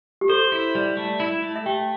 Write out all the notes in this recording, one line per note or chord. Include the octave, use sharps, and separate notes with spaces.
G4
A4 C5
E4
G3
A3
E4
A3
E5
A3 G4 G5